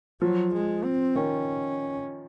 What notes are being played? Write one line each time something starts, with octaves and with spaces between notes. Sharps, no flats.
F3 F#3
G#3
C4
D#3 C#4